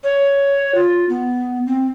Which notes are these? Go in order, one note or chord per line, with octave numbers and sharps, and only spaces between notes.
C#5
F4
B3
C4